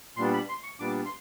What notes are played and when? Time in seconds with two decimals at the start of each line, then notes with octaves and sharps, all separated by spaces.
0.17 A#2 G3 B3 D4 C6
0.33 B5
0.49 C6
0.63 C#6
0.79 A#2 G3 B3 D4 D6
1.06 C6